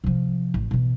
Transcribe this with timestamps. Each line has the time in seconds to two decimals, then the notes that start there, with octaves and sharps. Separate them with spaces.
0.04 C3 F3
0.54 A1
0.71 B2 E3